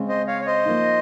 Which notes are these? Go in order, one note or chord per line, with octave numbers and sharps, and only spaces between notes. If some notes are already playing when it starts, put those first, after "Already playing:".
Already playing: C#3 G#3 C4
C5 D#5
C#5 F5
C#5
C5 D#5
F3 A#3 D#4